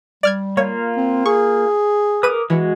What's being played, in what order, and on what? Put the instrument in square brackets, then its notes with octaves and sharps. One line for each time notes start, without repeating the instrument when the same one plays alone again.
[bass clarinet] G3 [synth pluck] D5 F6 G#6
[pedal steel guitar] A#3 F4 [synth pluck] C#5
[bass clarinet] C4
[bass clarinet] G#4 [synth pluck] C#6
[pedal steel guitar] A#4 D6 D#6 [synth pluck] B4 D#7
[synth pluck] E3 [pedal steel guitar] G#3 F#4